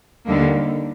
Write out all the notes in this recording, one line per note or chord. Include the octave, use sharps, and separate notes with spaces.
D#2 D3 G3 A#3